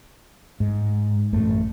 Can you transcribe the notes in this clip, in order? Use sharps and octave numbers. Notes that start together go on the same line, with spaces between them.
G#2
A1 F#2 A3